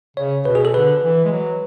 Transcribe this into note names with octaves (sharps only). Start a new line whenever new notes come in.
C#3 C#5
B2 B4
G#4
A4
D3 B4
E3
G#3
F#3